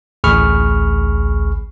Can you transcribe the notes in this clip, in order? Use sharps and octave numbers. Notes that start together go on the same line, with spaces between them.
A1 D2 G#4 B5 C#6 F6